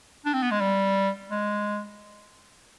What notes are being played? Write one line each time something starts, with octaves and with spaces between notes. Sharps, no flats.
D4
C4
B3
G#3
G3
G#3